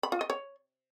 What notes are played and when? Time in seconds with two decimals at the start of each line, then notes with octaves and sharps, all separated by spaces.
0.03 B5
0.12 F4
0.21 D#5
0.30 C#5